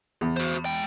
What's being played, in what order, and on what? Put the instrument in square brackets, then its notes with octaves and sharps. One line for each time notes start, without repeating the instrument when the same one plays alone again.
[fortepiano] E2
[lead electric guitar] F#4 C5
G#3 G5